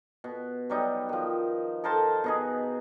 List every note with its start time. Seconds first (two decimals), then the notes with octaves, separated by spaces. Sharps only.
0.24 B2
0.70 F#3 G3 D#4
1.09 D#3 F3
1.84 A4 A#4 C5 A5
2.24 B2 D#4 G#4